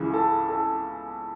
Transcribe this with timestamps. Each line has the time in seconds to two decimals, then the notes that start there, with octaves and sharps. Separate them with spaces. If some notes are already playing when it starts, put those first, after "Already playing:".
Already playing: C#2 C#3 E3 G#4
0.13 A4
0.49 A4